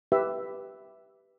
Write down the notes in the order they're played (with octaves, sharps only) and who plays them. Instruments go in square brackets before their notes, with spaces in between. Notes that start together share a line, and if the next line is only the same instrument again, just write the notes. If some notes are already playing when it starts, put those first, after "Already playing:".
[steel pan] G4 B4 E5